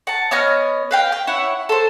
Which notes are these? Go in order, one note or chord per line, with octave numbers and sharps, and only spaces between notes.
F#5 A5
B3 C#5 D#5 F6
B4 F5 G5
G5
E4 C#5 F#5
A4 C5